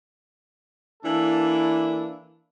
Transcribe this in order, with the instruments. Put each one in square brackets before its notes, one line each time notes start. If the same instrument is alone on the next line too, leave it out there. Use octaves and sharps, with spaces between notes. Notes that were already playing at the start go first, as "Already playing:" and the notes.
[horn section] E3 A#3 D4 E4 A4